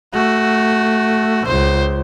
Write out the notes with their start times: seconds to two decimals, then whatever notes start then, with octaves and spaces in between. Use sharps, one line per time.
0.14 A3 F#4
1.47 C#2 C5